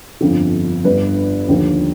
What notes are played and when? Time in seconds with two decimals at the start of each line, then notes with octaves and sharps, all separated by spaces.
0.21 G1 F2 D3 F3
0.84 G1 G2 D3 B4
1.48 D#2 D3 F3